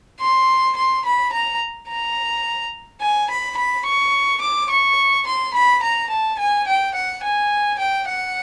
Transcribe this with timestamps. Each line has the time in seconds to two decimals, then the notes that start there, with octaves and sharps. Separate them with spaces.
0.20 C6
0.77 C6
1.05 B5
1.32 A#5
1.89 A#5
3.01 G#5
3.30 B5
3.57 B5
3.86 C#6
4.41 D6
4.70 C#6
5.27 C6
5.54 B5
5.83 A#5
6.10 A5
6.39 G#5
6.67 G5
6.94 F#5
7.23 G#5
7.79 G5
8.08 F#5